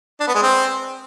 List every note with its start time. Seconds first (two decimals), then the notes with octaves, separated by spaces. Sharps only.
0.20 D4
0.28 B3
0.35 G#3
0.42 C4